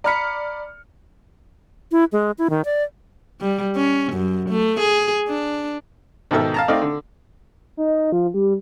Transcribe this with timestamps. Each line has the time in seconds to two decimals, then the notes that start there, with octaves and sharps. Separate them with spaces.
0.04 D5 A#5 B5 F6 B6 C#7
1.92 E4
2.12 G#3
2.38 E4
2.50 D#3
2.65 D5
3.41 G3
3.76 C#4
4.13 F#2
4.50 A3
4.80 G#4
5.28 D4
6.31 G#2 B2 D#3 A4 E5 E6
6.54 F5 A5 A#5
6.68 A3 C4 D#4 D5 F5
6.82 D3
7.77 D#4
8.12 F3
8.34 G3